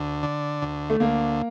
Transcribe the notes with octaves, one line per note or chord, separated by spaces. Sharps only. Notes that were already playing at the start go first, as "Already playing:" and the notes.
Already playing: D2
D3
D2
A3
D2 A#3